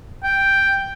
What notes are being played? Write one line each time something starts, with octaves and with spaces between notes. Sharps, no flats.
G5